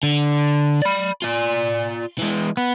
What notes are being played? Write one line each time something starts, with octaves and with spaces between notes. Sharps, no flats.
D3
D5 B5
F4 D5
E3 G#3
B3